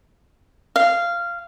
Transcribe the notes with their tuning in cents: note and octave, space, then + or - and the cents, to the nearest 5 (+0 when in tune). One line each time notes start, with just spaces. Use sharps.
F5 -15